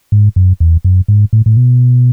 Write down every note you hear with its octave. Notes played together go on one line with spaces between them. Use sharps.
G#2
F#2
E2
F#2
G#2
A2
A2
B2